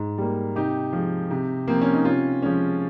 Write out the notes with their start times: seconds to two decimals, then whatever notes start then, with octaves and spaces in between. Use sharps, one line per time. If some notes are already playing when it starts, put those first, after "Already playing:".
Already playing: G#2
0.18 G3 A#3
0.56 C3 D#4 G4
0.93 F3 G#3
1.31 C3
1.68 F3 A#3 C4
1.82 C#4
1.94 D#4
2.05 C3 C#4 F4
2.42 F3 G#3 C#4